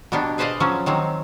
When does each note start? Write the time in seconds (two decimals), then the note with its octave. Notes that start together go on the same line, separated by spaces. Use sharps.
0.12 B2 A#3 B3 D4 G4
0.38 G#4 B4 C5 D5 D#5 F5
0.60 F3 F#3 C#4
0.86 D#3 F#3 C4